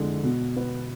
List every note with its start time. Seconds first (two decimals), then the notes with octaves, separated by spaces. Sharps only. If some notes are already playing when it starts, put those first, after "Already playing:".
Already playing: F2 D3 G#3 E4
0.23 B2
0.56 B3